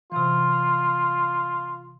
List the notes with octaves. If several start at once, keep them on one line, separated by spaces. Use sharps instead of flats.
C3 E3 F4